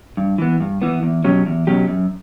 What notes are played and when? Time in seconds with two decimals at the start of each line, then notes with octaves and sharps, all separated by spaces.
0.17 G2
0.38 E3 B3
0.60 G2
0.82 E3 B3
1.03 E2
1.24 B2 F#3 C#4 G4
1.46 E2
1.67 B2 F#3 C#4 G4
1.88 F#2